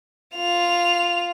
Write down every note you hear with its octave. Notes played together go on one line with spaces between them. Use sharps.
F4 F7